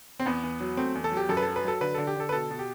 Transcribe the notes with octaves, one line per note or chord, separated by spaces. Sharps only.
C4
E2 B3
E2
F#3
A3 C4
E2
A4
F#3
G4
F#2 A4
B4
F#3 A4
B4
F#3 A4
D3 B4
D3 A4
G4
D3 A4
B4
B2 A4
B2
G4